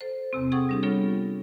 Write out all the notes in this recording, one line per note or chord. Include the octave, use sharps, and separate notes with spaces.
A4 C5
E2 C3 C4
G#4 A4 F#5 G5 C#6 D#6
G3 D4 G4
G3 B3 D4 F4 A4 C#5